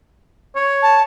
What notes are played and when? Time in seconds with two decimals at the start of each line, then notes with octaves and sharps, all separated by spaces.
0.56 C#5
0.82 A5